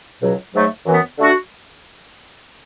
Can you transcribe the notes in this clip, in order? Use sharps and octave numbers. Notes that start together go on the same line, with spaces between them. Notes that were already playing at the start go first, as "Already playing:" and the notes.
C#2 B2 F#3
G#2 F#3 A3
F#2 E3 B3
D3 A3 D4 F#4